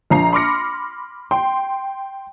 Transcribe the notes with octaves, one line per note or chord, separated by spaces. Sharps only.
A#1 F3 A#5 C7
B5 C6 D6 F6 A#6 C#7
G5 C6